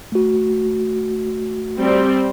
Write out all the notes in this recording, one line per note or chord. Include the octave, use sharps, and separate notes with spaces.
A3 F#4
G3 C4